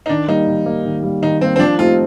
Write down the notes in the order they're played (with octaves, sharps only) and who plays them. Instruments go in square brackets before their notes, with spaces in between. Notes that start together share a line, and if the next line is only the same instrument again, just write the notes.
[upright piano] D#4
[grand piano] D#3 [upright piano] D4
[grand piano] G3 A#3 [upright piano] D#4
[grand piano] D#3
G3 A#3
D#3
G3 A#3
[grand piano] D#3 [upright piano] D#4
[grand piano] G3 A#3 [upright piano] C4
[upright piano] C4
[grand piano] F3 [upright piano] D4
[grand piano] A3 C4 D#4 G4 [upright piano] F4